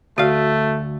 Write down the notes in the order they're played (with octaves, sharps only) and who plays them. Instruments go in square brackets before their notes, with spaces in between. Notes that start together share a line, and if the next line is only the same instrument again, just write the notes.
[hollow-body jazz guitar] D2 F5 [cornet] A3 [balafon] F#4